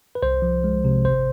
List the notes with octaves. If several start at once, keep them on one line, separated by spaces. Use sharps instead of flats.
B4
C2 C5
F3
G#3
C3
G#1 C5